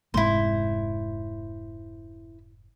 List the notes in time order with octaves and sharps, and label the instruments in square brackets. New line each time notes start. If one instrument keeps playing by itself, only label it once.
[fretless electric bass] F1 G#2 C3 [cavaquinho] E4 C5